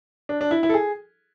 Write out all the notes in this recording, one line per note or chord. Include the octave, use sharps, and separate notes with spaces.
D4
D4
E4
E4
A4
G#4